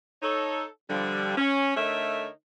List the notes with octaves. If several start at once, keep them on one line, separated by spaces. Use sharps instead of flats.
D#4 A4 C#5
D3 F3 G3
C#4
D3 A3 D#4 A#4 C#5 E5